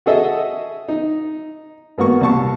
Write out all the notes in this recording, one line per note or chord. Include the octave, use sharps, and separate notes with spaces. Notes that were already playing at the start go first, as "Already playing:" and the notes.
F#4 G#4 A4 D#5 E5
D#4
G#1 A#3 B3 F#4 A#4 C#6
C2 A#2 A5 C#6